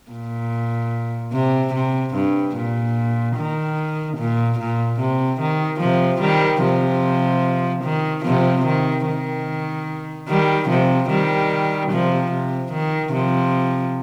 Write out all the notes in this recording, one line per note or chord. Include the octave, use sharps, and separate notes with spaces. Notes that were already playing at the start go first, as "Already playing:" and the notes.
A#2
C3
C3
G2
A#2
D#3
A#2
A#2
C3
D#3
C3 F3
D#3 G3
C3 F3
D#3
C3 F3
D#3
D#3
D#3 G3
C3 F3
D#3 G3
C3 F3
C3
D#3
C3 F3